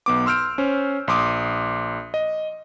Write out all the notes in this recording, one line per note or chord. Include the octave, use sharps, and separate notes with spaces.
B1 B3 D6
C6 E6 F6 G6 D7
C#4 C5
A#1 C6 D6 D#6
D#5